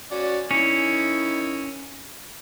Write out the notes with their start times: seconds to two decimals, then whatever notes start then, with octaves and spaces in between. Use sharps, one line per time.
0.11 C#4 F#4 D5
0.51 D#3 C#4 E4